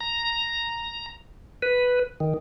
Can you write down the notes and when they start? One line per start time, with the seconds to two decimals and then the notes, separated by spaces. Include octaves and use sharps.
0.01 A#5
1.62 B4
2.20 D#3